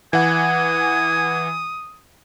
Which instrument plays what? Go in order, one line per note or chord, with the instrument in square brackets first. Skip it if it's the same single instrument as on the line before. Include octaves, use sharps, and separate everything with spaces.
[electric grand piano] E3 F#5 [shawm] G#5 [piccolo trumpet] D#6